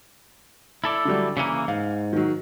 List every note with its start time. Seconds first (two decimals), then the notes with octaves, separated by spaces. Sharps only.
0.84 E4 A4 D5
1.05 D3 F#3 G3
1.37 C#3 E3 A#3 C#7 D#7
1.68 G#2 F5
2.13 D#3 F#3